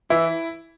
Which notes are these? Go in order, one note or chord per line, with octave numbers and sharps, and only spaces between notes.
E3 E4